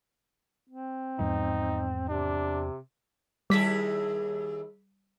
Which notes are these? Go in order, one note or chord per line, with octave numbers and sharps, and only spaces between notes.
C4
E2 G#2 F3 G#3 D#4
C3 D4
D#2 G3 E4 G#4 B6